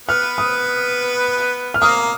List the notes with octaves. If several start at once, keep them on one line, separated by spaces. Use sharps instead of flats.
B3 B4 F6
D#6
F6
A#3 A#4 D#6
A#4